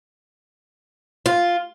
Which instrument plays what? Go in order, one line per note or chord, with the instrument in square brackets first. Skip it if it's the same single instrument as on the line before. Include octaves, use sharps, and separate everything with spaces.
[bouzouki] F4